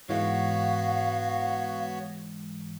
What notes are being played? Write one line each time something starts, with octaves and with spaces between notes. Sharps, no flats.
G#2 E3 G#3 B3 F#4 C#5 F5